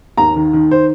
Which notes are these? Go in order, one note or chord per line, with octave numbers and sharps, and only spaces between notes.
D#2 A#5
D#3
D#3
C5